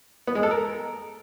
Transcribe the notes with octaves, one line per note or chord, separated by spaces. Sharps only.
B3
G#3
A4
A#4